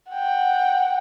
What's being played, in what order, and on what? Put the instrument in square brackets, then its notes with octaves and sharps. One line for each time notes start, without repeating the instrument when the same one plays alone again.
[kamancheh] F#5 G5